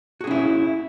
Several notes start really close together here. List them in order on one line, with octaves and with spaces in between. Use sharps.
F#4 G#4 C#4 E4